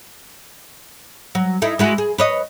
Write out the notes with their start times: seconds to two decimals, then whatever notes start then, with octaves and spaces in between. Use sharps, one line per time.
1.35 F#3
1.62 D#4 E4 A4
1.79 G#3 E4 F#4
1.98 G#4
2.18 B4 C#5 D#5